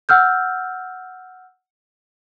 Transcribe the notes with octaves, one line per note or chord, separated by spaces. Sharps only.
F#5 E6 F6 G6